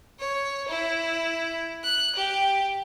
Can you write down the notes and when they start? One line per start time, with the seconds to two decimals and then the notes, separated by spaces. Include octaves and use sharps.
0.19 C#5
0.68 E4
1.84 F#6
2.16 G4